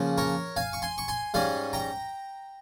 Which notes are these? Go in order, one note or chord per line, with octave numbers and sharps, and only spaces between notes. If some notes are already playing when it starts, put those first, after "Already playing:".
Already playing: C#3 F3 A#3 C#4
A#4 C#5
F5 G#5
C#6
G#5 C6
C#6
G#5 C6
G#2 G3 C#4 F5 G#5
G5 A#5